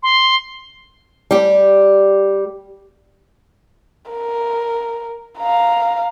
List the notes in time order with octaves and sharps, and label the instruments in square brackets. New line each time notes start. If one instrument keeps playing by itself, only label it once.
[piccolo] C6
[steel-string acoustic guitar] G3 G4
[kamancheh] A#4
F5 A#5